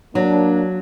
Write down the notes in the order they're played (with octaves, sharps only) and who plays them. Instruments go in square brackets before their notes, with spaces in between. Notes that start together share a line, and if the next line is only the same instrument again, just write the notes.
[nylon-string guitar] F#3 [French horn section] A#3 D4